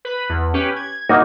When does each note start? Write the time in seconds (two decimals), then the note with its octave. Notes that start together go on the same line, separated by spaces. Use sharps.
0.05 B4 B5
0.29 E2
0.54 C#4 G4 B4
0.76 G#6
1.09 A#3 D#4 F#4